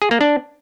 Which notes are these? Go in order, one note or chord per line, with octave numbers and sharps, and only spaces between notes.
G#4
A#3
D4